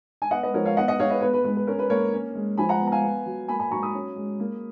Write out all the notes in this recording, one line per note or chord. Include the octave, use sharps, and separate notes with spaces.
G#5
B3 D#5 F#5
B4 D#5
F3 A#4 C#5
C#5 F5
B3 D#5 F#5
D#5 F#5
G#3 C#5 F5
B4 D#5
B3 B4
B4
G#3 B4
B4
C#4 A#4
B4
A#3 A#4 C#5
C#4
G#3
F3 G#5 B5
F#5 A#5
B3
A#5
F5 G#5
B3
F#3
A#3 G#5 B5
G#5 B5
F#3 A#5 C#6
B5 D#6
C#4
G#3
A#3